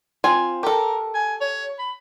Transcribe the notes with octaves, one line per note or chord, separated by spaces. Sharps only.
C4 F4 G#5
G4 A4 A#4
G#5
C#5
B5